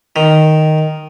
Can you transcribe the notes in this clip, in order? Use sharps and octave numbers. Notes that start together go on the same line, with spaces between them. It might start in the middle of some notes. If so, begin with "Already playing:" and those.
D#3